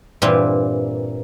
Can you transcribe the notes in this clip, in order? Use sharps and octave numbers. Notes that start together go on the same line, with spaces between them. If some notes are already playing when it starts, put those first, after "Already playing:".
G2 A#2 E3 A#3 C4 G4